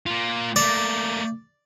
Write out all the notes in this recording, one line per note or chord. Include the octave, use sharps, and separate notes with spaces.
A#3 F4
A3 A#3 D5